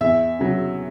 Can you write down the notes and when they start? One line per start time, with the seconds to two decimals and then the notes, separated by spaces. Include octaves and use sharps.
0.01 E2 E5
0.39 C#3 F#3